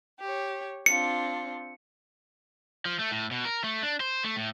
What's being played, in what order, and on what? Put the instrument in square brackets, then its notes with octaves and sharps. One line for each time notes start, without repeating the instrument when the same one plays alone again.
[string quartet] G4 C#5
[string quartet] C4 D4 F4 [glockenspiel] C#7
[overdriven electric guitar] F3
A3
A2
B2
A#4
A3
D4
C5
A3
A2